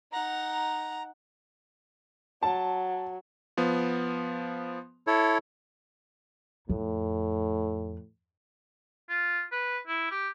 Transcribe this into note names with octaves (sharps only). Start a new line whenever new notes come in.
D#4 F#5 A#5
F#3 A5
F3 B3
E4 A4 C#5
F2 A2
F4
B4
E4
G4